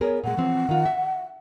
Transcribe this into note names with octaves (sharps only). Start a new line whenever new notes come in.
B3 G#4 A#4 C#5
A#2 G#3 F#5
E3 F3 C4
D#3 F4
E5